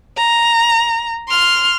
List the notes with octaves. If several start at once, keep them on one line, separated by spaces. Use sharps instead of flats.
A#5
C6 F6